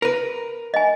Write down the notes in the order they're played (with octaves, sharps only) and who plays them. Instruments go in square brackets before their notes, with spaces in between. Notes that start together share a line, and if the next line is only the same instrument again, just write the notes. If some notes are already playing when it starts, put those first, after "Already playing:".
[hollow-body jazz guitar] A#4 B4
[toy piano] D#5 G#5